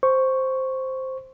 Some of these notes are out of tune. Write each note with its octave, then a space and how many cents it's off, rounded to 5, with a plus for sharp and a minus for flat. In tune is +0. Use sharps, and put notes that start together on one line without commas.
C5 +0 C#6 +0